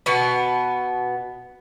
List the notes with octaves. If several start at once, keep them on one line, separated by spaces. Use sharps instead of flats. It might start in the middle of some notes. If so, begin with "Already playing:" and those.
B2 B3